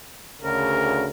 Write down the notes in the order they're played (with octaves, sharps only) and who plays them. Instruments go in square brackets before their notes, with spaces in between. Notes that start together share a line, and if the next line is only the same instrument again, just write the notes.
[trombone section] D2 C#3 [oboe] A#4